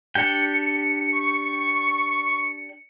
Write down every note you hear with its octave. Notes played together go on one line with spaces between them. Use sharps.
D4 G4 G5 C#7
C#6